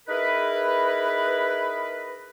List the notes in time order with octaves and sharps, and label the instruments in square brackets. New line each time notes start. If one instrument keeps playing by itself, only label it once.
[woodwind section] D#4 E4 G#4 A#4 B4